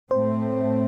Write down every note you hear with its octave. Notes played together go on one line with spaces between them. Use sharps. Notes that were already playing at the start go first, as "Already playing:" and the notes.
A2 A3 C4 C5